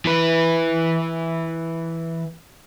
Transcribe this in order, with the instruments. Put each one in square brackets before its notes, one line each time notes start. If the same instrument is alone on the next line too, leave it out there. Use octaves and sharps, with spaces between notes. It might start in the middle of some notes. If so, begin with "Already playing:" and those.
[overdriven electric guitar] E3 B4